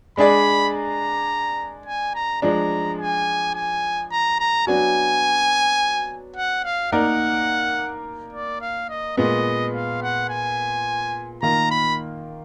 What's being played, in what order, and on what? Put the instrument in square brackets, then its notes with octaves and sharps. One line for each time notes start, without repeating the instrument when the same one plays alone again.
[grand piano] G#3 D4 G#4 D5 [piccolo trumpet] B5
[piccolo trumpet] A#5
G#5
A#5
[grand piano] F3 G#3 D4 [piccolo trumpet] A#5
[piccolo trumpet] G#5
G#5
A#5
A#5
[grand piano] F#3 B3 D4 F#4 [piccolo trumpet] G#5
[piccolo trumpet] F#5
F5
[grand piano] A#3 D#4 A#4 D5 [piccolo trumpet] F#5
[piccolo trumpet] D5
F5
D#5
[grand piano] A#2 G#3 B3 [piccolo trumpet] D#5
[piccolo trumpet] F5
F#5
G#5
[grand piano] D#3 A#3 F4 [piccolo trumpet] A#5
[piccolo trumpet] B5